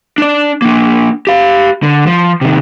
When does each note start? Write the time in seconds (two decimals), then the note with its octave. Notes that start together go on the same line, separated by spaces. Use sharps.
0.18 D4 D5
0.62 A#3 D4
1.27 G4 F5
1.83 D3
2.07 F3
2.41 C3 D#3